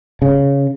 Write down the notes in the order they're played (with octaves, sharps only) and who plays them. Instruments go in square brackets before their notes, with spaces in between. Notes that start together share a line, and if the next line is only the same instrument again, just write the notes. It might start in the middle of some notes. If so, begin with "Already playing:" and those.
[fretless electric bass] C#3